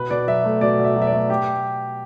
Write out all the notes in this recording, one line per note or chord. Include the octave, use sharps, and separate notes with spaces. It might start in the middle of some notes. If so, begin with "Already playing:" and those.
Already playing: B2 B4
B2 D5
F#3 E5
A3
B2 D5
B2
E5
F#3
E5
D5
A3
G4